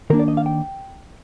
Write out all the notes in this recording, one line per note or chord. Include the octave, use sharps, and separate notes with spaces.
D#3 A#3 D4 A#4
D5
D#5
F5
G5